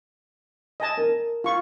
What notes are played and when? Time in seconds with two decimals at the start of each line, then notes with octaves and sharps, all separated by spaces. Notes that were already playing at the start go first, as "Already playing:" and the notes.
0.80 D#5 G#5 A5
0.97 A#4
1.44 F4 C#6